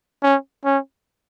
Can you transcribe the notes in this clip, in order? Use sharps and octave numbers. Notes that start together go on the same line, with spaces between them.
C#4
C#4